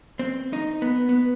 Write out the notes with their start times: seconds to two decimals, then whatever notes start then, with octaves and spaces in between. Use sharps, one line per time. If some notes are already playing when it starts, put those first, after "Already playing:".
0.19 C4
0.53 D#4
0.82 B3
1.09 B3